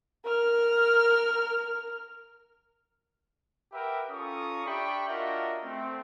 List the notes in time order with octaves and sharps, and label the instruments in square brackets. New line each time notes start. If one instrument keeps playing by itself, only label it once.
[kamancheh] A#4 F6
[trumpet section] G4 A#4 B4 E5 F#5 G5
C#4 F4 A4 A#5 C#6 D#6
D4 G4 E5 G5 B5 C#6
D4 F4 F#4 A#4 D#5 E5
A3 C4